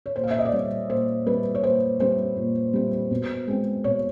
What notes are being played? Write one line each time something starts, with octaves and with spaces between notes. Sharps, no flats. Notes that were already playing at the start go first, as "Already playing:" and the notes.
C#5
A#2 C5
F5
E5
D#5
D5
G3 C4 C#5
A#2 C5
G3 C4 B4
C#5
A#2 C5
G3 C4 C5
A#2
G3 C4
B2
G#3 C4
B2 C#5